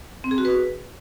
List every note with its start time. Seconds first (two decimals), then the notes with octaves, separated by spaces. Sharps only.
0.24 C4
0.31 G#4
0.38 F#4
0.45 B4